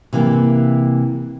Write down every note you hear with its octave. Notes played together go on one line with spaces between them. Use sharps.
C3 E3 A#3